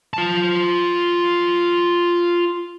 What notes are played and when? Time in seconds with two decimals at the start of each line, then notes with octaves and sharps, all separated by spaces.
0.14 F4 A5